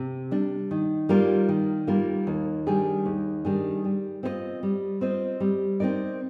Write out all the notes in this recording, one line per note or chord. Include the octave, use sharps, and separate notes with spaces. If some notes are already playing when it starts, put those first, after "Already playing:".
Already playing: C3
G3 D4
D#3
G3 A#3 F4 A#4
D#3
G3 A#3 F4 A#4
D#2
D#3 G3 D4 G#4
D#2
D#3 G3 D4 G#4
G3
C4 F4 C5 D#5
G3
C4 F4 C5 D#5
G3
C4 D#4 A#4 D5